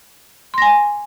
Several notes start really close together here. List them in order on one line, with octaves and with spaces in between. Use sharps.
C6 A#6 G#5